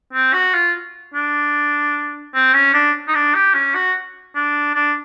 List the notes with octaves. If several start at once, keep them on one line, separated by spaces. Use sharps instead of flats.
C4
F#4
F4
D4
C4
C#4
D4
D#4
D4
G4
C#4
F#4
D4
D4